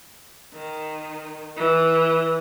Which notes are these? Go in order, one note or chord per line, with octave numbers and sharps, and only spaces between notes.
D#3
E3